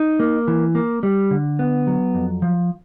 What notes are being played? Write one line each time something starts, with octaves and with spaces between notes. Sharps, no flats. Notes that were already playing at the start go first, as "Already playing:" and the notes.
Already playing: D#4
A#3
E3
A#3
G3
D3
B3
F#3
F2
F3